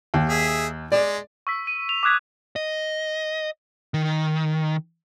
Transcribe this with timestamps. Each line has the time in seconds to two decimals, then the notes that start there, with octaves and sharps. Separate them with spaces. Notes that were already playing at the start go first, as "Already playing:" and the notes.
0.14 D#2
0.29 G#4 E5
0.92 G#3 D5
1.47 C#6 E6 B6
1.67 D#7
1.89 F7
2.03 D6 D#6 F#6 G#6 B6
2.56 D#5
3.94 D#3